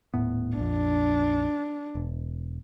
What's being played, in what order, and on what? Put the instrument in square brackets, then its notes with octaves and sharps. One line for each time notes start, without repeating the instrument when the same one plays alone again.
[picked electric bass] D#1 A2 B3
[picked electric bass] A#1 F2 [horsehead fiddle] D4
[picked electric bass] E1